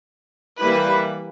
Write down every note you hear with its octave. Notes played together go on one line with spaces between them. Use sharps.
E3 G3 A#3 E4 B4